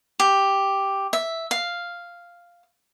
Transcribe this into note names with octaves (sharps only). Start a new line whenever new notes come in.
G4
E5
F5